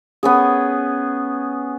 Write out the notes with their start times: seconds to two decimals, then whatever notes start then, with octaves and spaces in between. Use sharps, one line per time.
0.23 B3 C#4 G#4